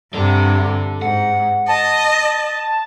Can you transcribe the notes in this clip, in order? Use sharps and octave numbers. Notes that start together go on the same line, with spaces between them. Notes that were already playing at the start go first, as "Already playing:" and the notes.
G2 C3 A4 D5
G#2 F#5
D#5 A5